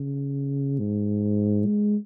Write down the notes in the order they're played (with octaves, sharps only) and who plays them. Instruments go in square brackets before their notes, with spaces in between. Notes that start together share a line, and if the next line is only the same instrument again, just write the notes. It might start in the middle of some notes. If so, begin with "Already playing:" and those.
Already playing: [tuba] C#3
G#2
G#3